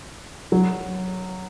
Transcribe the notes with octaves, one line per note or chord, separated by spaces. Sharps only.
F#3